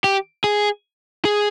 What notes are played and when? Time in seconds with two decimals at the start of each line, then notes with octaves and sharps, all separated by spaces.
0.04 G4
0.44 G#4
1.25 G#4